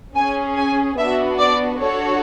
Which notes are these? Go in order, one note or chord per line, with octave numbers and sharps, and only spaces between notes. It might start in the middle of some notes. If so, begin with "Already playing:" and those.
C#4 G#4 G#5
G#5
B3 D4 F#4 E5
D5
D4 F#4 A4 C#5